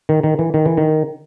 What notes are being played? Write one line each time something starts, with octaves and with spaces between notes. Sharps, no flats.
D#3
D#3
E3
D#3
E3
D#3